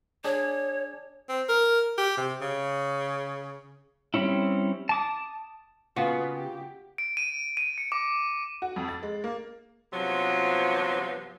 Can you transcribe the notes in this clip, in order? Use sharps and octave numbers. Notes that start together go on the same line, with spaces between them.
D4 G#4 C#5
C4
A#4
G4
C3
C#3
G3 C4 C#4 E4
A5 D6 D#6
C#3 A#3 B3 F4 F#4
G4
D7
D#7
D#7
C#7
D6
F#4
F2
A6
G#3
A#3
G2 C3 F3 F#3 B3